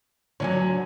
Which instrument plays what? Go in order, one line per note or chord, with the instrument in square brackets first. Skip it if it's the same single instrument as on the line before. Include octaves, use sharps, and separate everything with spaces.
[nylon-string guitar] D3 F3 F#3 [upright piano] C#5 G#5